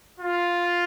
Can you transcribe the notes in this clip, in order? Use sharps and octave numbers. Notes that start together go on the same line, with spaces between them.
F4